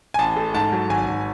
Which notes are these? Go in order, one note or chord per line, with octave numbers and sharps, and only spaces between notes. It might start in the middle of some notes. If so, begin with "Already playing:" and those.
G#5
A1 A5
A3
G#2 A5
F#3
G#1 G#5
G#1